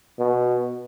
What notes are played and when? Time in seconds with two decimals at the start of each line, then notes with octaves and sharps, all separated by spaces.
0.19 B2